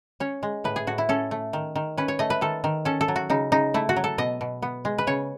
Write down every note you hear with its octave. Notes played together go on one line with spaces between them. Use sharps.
C#4 C#5
G#3
A2 B4
G#4
A2 F#4
E4
C#4 A4
A3
D#3
D#3
C#4 B4
C#5
A3 D#5
B4
D#3 A4
D#3
C#4 A4
A4
F#3
F#4
C#3 D#4
C#3 D#4
A3 E4
F#4
F#3
A4
B2 D#5
B2
B3
G#3
B4
C#3 C#5